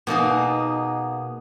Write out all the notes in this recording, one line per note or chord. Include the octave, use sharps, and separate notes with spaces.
B2 A#3 D#4 G#4